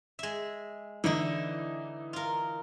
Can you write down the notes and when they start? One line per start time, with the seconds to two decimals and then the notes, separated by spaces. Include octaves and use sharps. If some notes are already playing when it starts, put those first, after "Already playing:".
0.19 G#3 E5
1.04 D3 E3 D#4 E4 D#5
2.13 F4 A#4